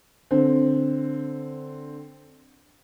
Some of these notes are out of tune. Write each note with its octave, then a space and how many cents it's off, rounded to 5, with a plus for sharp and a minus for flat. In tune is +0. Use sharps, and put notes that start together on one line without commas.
D3 +0 C4 +0